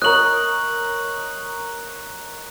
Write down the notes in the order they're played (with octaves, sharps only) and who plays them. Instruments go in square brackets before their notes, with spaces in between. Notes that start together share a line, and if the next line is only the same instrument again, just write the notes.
[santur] A#4 C#5 D#5 [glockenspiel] F#6 F#7